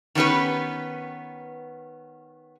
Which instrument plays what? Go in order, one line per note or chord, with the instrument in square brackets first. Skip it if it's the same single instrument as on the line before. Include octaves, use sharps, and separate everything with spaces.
[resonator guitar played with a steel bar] D#3 B3 C#4 G4 B4